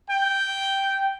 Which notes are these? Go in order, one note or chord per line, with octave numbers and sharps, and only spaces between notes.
G5